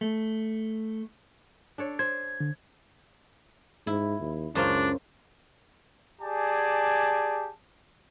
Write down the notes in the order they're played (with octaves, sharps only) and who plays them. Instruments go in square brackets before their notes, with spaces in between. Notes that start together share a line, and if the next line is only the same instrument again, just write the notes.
[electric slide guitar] A3
[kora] D4 A4 C#5
[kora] C5 [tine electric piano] G#6
[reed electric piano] D3
[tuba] G#2 [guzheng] E4
[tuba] D#2
[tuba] C#2 [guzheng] F#2 C5 F5 [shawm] D4
[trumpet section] G4 G#4 D5 G#5 A5